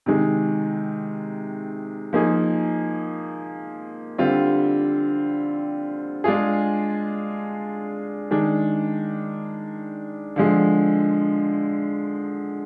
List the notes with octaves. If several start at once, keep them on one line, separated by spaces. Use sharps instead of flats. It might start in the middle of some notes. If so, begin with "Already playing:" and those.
C3 D#3 G#3
F3 A#3 D#4 G#4
D3 G3 C4 F4
G#3 D4 F4 G#4
D#3 G#3 D4
D3 F3 G#3